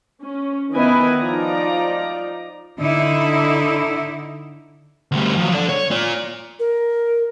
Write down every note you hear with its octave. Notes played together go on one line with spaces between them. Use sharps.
C#4
D#3 B3 E4 B4 D#5 G#5
F3 D#4 F4 D5 A#5
D3 D#4 E4
D2 G3
F3 F#3
A4 D5
C#5
F4 D5
A#4